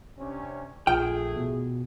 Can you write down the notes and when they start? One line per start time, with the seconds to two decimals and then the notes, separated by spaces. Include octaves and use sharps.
0.18 C3 C#4 D4
0.87 A#1 A3 F4 G#4 G5
1.36 B2